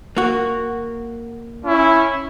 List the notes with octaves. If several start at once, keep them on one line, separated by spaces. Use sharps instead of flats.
A#3 F#4
C#4 E4